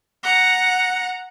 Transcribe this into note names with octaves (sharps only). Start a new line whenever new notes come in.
F#5 A#5